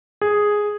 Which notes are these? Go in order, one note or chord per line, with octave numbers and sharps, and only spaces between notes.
G#4